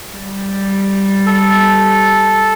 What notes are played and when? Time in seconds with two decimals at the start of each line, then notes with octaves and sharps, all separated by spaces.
0.12 G3
1.26 A4